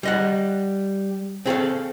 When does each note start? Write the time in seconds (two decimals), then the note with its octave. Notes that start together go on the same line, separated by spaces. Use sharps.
0.03 G3 D#5 F#5
1.46 C4 G#4 A4 F5